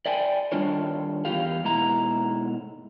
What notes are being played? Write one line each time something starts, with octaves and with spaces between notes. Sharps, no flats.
D5 E5 G5 G#5
D#3 G3 D4 F4 C#5
E2 G4 F5
G#2 B2 E4 A#5